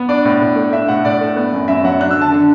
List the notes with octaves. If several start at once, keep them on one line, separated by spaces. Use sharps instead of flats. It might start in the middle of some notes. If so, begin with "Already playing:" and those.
Already playing: B3
D4 D5
A2
A2
A3
D4 E5
A2 F#5
A2 D5
A3
B3
F#2
F#2 E5
F#3 F#5
D4 F#6
E6
D3 A5
D3